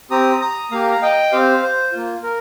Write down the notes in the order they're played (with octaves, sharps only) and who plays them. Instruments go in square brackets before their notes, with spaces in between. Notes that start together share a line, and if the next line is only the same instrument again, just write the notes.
[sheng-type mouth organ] C4 G4 A#5 D#6
A#5 D#6
A#3 G4 F5 A#5
A#5
D#5 G5
C4 G4 C5 F5
C5
A#3 F4
A#4